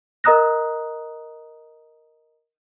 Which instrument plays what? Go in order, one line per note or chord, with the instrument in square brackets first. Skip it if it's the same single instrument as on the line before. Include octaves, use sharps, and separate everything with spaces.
[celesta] A#4 D#5 A#5 D#6 F#6 A#6